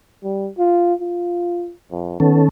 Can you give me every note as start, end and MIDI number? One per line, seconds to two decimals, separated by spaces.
0.23 0.49 55
0.58 0.94 65
1.01 1.71 65
1.91 2.15 41
2.20 2.49 51
2.20 2.40 59
2.20 2.49 61
2.20 2.49 69